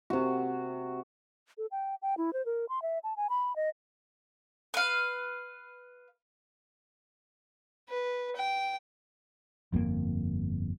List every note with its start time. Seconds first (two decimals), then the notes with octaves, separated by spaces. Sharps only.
0.10 C3 F#4
1.58 A4
1.71 G5
2.02 G5
2.18 E4
2.33 C5
2.46 A#4
2.69 C6
2.82 E5
3.04 A5
3.17 G#5
3.30 B5
3.56 D#5
4.74 B4 F5
7.89 B4
8.36 G5
9.72 G1 F2 B2 A#3